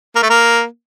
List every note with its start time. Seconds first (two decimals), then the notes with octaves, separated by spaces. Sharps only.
0.15 A#3
0.22 A3
0.29 A#3